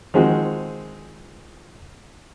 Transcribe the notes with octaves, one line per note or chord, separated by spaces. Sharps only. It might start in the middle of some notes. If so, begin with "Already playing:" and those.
D#3 F3 G#3 C4 F#4 G#4